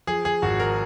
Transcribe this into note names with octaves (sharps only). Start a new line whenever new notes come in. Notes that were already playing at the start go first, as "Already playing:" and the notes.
F3 G#4
G#4
G#1 F#4
A#4